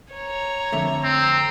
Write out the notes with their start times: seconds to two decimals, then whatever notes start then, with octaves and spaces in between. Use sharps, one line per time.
0.14 C#5 A#5
0.72 F2 D3 A3
1.04 C4 A#5